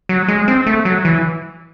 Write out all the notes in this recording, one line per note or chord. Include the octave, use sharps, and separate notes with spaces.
F#3
G#3
C4
A3
F#3
E3